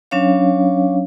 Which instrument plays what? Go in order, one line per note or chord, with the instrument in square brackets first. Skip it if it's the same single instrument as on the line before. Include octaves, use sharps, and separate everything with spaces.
[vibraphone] F#3 C#4 D4 C#5 F5